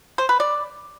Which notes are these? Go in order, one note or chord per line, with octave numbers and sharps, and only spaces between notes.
C5
B4
D5